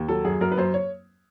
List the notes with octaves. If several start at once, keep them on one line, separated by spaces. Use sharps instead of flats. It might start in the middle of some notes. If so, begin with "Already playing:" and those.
Already playing: D#2
F#3 A4
F#2 G#4
F#2 A#4
B4
F#2 C5
C#5